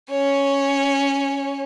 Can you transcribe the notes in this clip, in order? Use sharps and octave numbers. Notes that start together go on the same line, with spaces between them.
C#4 C#5